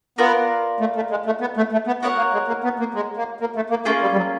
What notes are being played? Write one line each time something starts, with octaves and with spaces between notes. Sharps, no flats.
B3 F4 A#4 D5
A3
A3
G#3
A3
B3
A3
A3
B3
B3 F#4 A#4 C#5 F#5
A#3
G#3
A#3
B3
A#3
G#3
A#3
A#3
A3
A#3
A3 A#3 C#4 F4 G#4
G3
G3
F#3